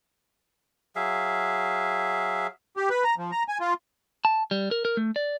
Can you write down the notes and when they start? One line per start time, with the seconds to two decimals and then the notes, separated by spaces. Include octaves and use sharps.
0.96 F#3 G#4 E5 F5
2.77 G4
2.90 B4
3.04 A#5
3.18 F3
3.32 A#5
3.48 G#5
3.60 F4
4.25 A5
4.51 G3
4.71 A#4
4.85 A#4
4.97 A3
5.16 D5